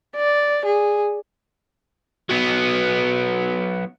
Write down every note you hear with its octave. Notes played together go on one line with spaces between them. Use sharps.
D5
G#4
F#3 B3